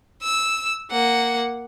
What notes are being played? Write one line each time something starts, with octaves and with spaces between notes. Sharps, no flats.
E6
A#3 F#5